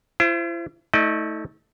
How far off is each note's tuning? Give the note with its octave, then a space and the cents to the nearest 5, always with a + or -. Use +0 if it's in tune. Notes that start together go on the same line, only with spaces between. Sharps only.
E4 +45 C5 +0
A3 +0 D#4 +45 D5 +45